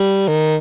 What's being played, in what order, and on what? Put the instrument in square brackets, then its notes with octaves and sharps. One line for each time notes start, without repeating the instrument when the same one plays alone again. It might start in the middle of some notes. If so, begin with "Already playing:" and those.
Already playing: [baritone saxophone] G3
D#3